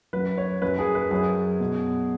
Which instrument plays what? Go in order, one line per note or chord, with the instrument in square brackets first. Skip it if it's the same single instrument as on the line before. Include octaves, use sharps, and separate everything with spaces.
[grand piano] F#2 F#3 B4
C#5
F#2 F#3 B4
G#4
B4
F#2 F#3 G#4
B2 F#3